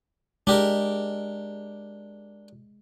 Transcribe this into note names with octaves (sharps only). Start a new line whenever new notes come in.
G#3 D4 G4 A#4